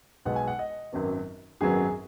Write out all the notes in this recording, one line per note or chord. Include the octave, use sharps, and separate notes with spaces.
B1 B2 G#3 B3 F#5
G#5
F#5
D#5
G#1 F#2 F#3 B3
G#1 F#2 F#3 B3 G#4